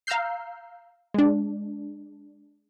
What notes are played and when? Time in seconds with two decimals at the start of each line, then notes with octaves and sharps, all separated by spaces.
0.07 F5 A#5 E6 F6 G6 C7
1.14 G#3 D4